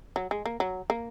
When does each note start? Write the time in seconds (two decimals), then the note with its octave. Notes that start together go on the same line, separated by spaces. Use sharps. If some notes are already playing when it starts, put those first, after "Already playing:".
0.16 F#3
0.31 G#3
0.46 A#3
0.60 F#3
0.90 A#3